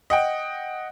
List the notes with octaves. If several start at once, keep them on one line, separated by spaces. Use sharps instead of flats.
D#5 F#5 G5